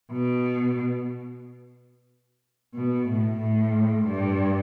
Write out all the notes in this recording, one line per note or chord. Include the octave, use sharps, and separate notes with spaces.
B2
B2
A2
A2
G2